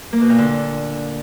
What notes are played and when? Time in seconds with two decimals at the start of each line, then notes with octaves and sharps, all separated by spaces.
0.13 A#3
0.21 B2
0.30 A#2
0.38 D3